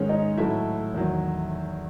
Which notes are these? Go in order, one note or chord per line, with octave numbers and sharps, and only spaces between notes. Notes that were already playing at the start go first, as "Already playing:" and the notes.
Already playing: G#2 D#3 G#3 C#4 C#5
D#4 D#5
A2 F#3 A3 E4 E5
E2 D#3 F#3